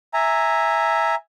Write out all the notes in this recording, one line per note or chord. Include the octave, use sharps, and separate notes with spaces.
E5 G#5 A#5